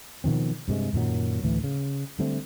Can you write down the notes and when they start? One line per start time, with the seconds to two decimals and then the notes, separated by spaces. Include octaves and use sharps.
0.24 B2 D#3 F3 C4
0.68 G2 C3 G#3
0.93 F#2 A#2 D#3 F#3
1.43 D2 A2 E3
1.64 C#3
2.19 D3 G3 A3 C4